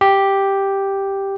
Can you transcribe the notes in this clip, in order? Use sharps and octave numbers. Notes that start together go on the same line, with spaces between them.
G4